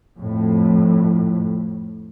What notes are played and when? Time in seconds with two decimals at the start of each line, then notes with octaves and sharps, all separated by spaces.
0.18 F2 A2